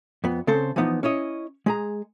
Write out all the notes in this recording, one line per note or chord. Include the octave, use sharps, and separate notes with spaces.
F2 B3
C#3 C4 A4 C5
E3 F3 B3 D#4
C#4 E4 C#5 D#5
G#3 G#4 A#5